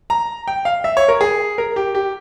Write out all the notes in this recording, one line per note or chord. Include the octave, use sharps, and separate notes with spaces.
A#5
G5
F5
E5
C#5
A#4
G#4
A#4
G4
G4